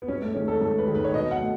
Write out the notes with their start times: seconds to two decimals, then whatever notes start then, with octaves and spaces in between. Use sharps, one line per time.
0.02 B3
0.08 G#2 C#4
0.22 A3
0.34 D#3 G#3 C#4
0.48 A4
0.61 G#2 A4
0.78 B4
0.87 D#3 G#3
0.95 B4
1.04 C#5
1.14 B2 D#5
1.31 F#5
1.40 A3